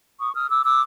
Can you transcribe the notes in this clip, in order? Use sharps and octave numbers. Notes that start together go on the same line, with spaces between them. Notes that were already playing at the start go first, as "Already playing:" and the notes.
C#6 D#6
D#6 F6
D6 E6
D6 E6